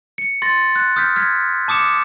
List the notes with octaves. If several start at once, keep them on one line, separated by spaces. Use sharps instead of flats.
C#7
C6 A6 A#6
F#6
D#6 F6 G6 B6
F6 G#6 B6
A5 D6 D#6 C#7 E7